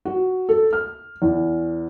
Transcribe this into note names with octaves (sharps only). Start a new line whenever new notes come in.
F#4
A4
F6
E2